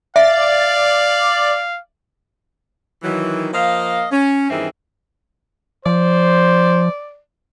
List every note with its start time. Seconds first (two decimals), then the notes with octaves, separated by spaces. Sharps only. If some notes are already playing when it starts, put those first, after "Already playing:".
0.16 D5 E5 F5
3.03 D#3 E3 F#3
3.53 F3 A#3 D#5 F5
4.11 C#4
4.50 G2 D#3 E3 C4 G#4 E5
5.86 F3 C5 D5